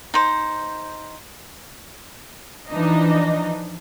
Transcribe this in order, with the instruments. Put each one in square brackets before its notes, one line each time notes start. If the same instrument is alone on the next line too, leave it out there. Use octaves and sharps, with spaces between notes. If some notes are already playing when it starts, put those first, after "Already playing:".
[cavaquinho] D#4 C5
[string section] E3 F3 D4 D#4 D#5